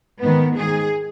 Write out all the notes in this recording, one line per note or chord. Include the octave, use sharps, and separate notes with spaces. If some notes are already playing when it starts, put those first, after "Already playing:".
G#2 D#3 B3
G#2 D#3 G#4